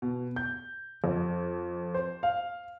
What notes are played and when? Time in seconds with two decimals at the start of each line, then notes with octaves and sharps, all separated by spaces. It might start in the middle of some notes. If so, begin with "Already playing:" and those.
0.02 B2
0.36 G6
1.04 F2
1.94 C5
2.23 F5